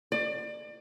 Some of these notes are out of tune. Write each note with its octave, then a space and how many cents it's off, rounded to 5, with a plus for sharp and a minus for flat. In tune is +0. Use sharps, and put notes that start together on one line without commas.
D5 +30